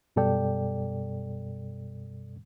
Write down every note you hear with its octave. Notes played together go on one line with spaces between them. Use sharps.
F#2 B2 G3 A4 D5 G5